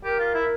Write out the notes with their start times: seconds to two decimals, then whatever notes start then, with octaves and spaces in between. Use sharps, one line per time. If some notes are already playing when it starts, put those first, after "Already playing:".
0.04 G4 A#4
0.19 F4
0.34 E4